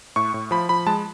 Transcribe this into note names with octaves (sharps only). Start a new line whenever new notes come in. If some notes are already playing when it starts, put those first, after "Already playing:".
A2 C#6
A2
F3 B5
F3 B5
G#3 A5